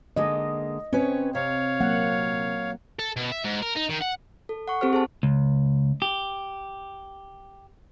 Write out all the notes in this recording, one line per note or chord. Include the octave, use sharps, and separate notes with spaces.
D3 G#3 A#3 D#5
C4 C#4 B4 C#5
C3 C#5 F5
F#3 A#3 F#5
A4
B2
E5
G#2
A#4
D#4
D#3
F#5
A4
F#5 C#6
C4 G4 A4 C5 F6
G#4 C5 A5
C#2
G4